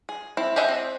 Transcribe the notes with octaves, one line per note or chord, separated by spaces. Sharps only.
G#4
C4 E4
G4 G#4 D#5 E5 F#5
C4